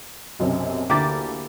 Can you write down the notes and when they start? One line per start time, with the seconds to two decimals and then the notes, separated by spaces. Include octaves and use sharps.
0.39 B1 F#2 C3
0.89 D2 D3 A#3 E4 G4 A6